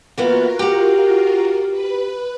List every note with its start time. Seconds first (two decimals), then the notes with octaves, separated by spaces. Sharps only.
0.18 E3 A#3 B3 F4 F#4 A#4
0.59 G4 F#5
1.70 B4